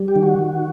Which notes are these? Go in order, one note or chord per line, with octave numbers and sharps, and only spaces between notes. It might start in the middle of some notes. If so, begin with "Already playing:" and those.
Already playing: G3
G4
D#3
F#4
D#3